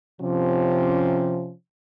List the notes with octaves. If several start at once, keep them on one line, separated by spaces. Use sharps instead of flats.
C3 F3 C#4